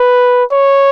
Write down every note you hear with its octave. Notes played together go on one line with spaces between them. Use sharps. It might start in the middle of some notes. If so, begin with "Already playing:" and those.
Already playing: B4
C#5